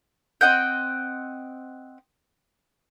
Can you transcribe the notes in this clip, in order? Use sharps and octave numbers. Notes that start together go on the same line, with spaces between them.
C4 D#5 F#5 G5